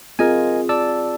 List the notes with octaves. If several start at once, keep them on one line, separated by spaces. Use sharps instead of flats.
C4 F4 G#4 A#4 D#5 G#5
D5 A5 E6